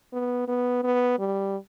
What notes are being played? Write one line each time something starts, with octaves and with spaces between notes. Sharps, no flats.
B3
B3
B3
G3